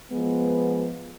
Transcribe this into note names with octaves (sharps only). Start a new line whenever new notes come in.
F3 G#3 B3